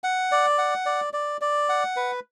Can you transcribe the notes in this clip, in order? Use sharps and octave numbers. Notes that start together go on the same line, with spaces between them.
F#5
D5
F#5
D5
D5
D5
F#5
B4